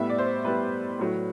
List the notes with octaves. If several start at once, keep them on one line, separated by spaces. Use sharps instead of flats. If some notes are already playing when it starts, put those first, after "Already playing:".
Already playing: A2 G3 B3 E5
D5
C5
A2 G3 B3 B4
A2 F#3 A3